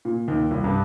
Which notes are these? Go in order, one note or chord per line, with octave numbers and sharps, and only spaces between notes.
A#2
D#2
C2
G2